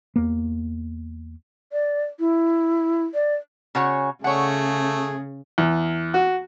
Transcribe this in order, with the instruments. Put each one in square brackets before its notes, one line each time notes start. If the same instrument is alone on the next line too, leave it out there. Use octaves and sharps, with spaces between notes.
[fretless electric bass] E2 A#3
[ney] D5
E4
D5
[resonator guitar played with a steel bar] C#3 F#4 C#5
[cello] C#3 [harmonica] A3 G#4 [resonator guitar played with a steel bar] C#5 F#5
[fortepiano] E2
F#4